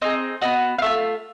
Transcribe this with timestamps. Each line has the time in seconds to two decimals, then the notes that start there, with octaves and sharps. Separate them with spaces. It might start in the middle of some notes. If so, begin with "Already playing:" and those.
0.02 C4 D#4 G#4 D#5
0.41 B3 D#4 F#4 D#5
0.78 F5
0.82 A3 D4 F4 E5